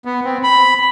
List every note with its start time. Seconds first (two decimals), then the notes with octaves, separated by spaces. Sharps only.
0.05 B3
0.24 C4
0.43 B5